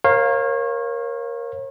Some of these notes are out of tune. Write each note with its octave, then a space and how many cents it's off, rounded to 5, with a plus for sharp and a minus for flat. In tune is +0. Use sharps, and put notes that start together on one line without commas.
A#4 +10 C#5 -35 F5 +5